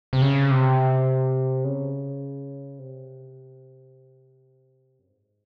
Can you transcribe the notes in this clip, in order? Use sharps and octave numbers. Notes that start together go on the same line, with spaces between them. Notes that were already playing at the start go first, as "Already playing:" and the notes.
C3
C#3
C3
C#3
C3
F#2
G#2